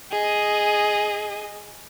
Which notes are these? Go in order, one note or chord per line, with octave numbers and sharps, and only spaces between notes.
G#4 D#5